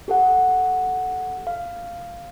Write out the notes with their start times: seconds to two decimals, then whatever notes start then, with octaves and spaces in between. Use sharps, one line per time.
0.08 G4 A4 F#5
1.47 F5